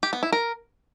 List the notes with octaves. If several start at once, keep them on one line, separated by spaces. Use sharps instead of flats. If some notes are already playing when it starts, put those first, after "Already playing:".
G4
B3
E4
A#4